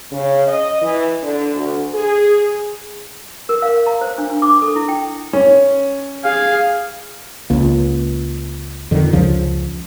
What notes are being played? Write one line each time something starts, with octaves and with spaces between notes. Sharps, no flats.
C#3
D#5
E3
D3
D2
G#4
A#4
F5
A#5
C5
D4
D4
D6
A4
E4
G5
C#4
G#4 F5
C#2 A#3
F2 D3 D#3
C#2 C#3 F3